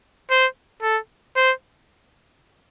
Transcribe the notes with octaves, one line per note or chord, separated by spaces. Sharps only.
C5
A4
C5